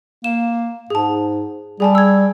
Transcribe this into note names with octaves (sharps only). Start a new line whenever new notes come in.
A#3 E7
G#2 G#4 A5
G3 G#4 G#5 A5
E6 G#6